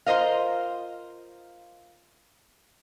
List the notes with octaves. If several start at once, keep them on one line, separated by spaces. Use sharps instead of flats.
F4 A#4 C5 D#5 F5